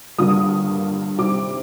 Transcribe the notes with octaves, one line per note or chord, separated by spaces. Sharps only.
G2 D3 G3 A#3 F4 D#6
C3 D#3 G3 D6